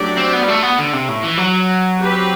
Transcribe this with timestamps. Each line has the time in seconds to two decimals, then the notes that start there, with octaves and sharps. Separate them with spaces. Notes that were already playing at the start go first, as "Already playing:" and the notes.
Already playing: F#3 A3 D4 G4 D5
0.18 C4
0.34 B3
0.44 G3
0.49 A3
0.63 B3
0.79 D3
0.94 C3
1.09 A2
1.24 E3
1.38 F#3
1.99 C4 G4 B4